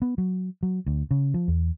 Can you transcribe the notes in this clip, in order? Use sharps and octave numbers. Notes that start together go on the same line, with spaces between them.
B3
F#3
F#3
D2
C#3
F3
E2